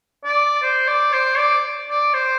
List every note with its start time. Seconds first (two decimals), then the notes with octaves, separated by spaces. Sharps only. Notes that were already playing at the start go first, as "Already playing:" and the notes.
0.24 D5
0.62 C5
0.88 D5
1.13 C5
1.38 D5
1.89 D5
2.14 C5